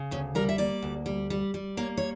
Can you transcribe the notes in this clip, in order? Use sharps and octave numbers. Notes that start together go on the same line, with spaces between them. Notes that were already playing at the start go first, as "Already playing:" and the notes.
Already playing: C#3
D2 C#4
G3 A#4
E5
A#3 D5
D2
G3
G3
G3
A#3 C#5
C#5